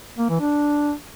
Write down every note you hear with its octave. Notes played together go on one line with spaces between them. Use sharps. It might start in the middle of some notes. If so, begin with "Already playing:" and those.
A#3
E3
D4